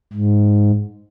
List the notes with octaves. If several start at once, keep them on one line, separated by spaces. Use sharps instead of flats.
G#2